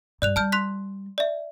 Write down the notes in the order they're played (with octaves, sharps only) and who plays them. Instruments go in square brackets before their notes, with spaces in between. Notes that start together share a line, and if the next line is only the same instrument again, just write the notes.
[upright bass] G2 [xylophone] D5 F#6 F7
[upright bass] G3 [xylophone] A5 F6 G6
[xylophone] C6 F#6 B6
D5 E5